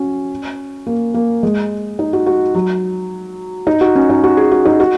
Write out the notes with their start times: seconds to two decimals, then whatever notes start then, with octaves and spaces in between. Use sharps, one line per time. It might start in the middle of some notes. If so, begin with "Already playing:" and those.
Already playing: C#4 F#4
0.87 A#3
1.14 A#3
1.43 G#3
1.99 D#4
2.13 F#4
2.26 F#4
2.55 F#3
3.67 D#4
3.81 F#4
3.96 C#4
4.10 D#4
4.24 F#4
4.37 G#4
4.51 F#4
4.65 D#4
4.80 F#4